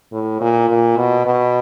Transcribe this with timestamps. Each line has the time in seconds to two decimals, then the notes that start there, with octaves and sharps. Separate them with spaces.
0.12 A2
0.41 A#2
0.69 A#2
0.97 B2
1.26 B2